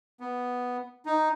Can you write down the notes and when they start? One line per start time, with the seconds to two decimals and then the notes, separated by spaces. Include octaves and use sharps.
0.20 B3
1.06 D#4